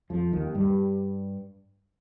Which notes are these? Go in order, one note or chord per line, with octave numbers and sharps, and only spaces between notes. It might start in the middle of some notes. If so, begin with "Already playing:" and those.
F2 F3
D#2 D#3
G2 G3